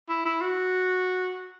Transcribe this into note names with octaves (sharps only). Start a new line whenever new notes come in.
E4
E4
F#4